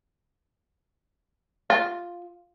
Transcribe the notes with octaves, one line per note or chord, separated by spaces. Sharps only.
F4